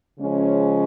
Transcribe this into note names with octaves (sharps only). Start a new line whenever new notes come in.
C#3 F3 G#3 C#4